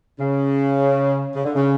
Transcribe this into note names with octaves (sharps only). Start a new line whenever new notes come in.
C#3
C#3
D3
C#3